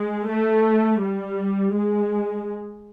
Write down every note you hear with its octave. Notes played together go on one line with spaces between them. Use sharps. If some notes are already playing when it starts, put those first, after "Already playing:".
Already playing: G#3
A3
G3
G#3